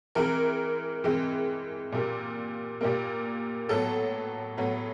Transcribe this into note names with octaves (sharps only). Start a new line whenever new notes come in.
E3 G#3 C4 A#4
E3 G#3 C4
A#2 G3 A#3
A#2 G3 A#3
A2 F#3 B3 A4
A2 F#3 B3